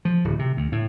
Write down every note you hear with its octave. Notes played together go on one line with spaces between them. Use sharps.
F3
D1
C3
D2
A2